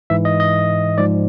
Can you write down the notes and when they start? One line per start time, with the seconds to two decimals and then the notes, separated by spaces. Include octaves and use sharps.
0.10 G#2 E3 E5
0.25 D#5
0.40 D#5
0.98 G#2 F3 D5